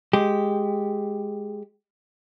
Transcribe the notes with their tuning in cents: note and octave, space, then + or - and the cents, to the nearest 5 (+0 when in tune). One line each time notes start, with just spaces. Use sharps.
G#3 +0 G4 +0